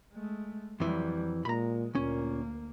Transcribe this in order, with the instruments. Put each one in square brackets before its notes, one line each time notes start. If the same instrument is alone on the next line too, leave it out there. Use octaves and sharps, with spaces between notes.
[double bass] G#3 A3
[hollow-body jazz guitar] F2 E3 [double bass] F#3 G3
[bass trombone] A#2 [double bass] G#3 [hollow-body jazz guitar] A#5 B5
[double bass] D2 A#3 [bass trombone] A#2 [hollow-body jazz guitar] C#4